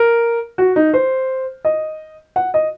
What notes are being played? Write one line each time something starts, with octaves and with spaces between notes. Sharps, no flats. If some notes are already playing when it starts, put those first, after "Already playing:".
Already playing: A#4
F#4
D#4
C5
D#5
F#5
D#5